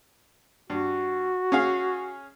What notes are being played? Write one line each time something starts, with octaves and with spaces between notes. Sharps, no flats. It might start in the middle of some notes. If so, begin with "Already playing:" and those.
G2 F#4
C#4 G#4 F5